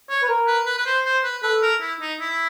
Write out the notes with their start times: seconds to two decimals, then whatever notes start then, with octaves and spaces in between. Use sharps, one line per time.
0.10 C#5
0.23 B4
0.29 A#4
0.47 B4
0.66 B4
0.78 B4
0.86 C5
1.05 C5
1.24 B4
1.43 A4 B4
1.62 A#4
1.81 E4
2.01 D#4
2.20 E4